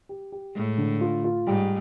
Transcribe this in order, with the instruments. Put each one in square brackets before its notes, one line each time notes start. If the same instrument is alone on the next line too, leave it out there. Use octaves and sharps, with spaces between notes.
[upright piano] G4
G4
[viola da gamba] A2 [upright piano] G#3
[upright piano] D3
F4
F4
[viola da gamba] G#2 [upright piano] G3